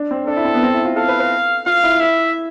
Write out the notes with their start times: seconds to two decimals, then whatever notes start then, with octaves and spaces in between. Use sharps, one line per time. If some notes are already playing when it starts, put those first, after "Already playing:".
Already playing: D4
0.11 C4
0.27 D4 A4
0.37 E4
0.44 C4
0.54 B3
0.63 C4
0.74 E4
0.85 F4
0.96 A4 F5
1.08 B4
1.20 B4
1.66 F4 F5
1.84 E4
2.00 E4 E5